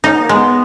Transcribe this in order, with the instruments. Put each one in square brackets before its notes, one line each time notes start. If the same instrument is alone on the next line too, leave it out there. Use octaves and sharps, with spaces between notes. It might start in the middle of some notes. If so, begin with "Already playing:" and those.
[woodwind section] C#4 [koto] D#4
[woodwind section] B3
A#3
[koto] G#3 [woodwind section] B3